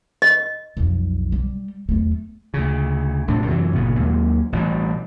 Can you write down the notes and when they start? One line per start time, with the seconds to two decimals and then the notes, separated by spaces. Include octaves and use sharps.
0.22 D#5
0.77 B1 F2
1.32 G3
1.89 E2 A3
2.54 D2 C#3
3.28 B1 A2 C3 D4
3.48 F#2 C3 E3 F#3
3.75 G1 A#2 C#3 B3
3.99 D#2 F#3 G#3 A#3
4.52 A1 B2 G3